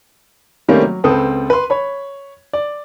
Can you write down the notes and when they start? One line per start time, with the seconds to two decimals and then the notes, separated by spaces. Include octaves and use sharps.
0.68 D#3 G3 A3 A#3 C4 C#4
0.83 F#3
1.04 C#2 C4 A4 B4 D#6
1.50 B4 C6
1.70 C#5 B5
2.53 D5